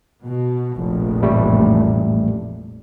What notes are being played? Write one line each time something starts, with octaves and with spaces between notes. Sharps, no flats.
B2
F1 A#1
A1 G3 A3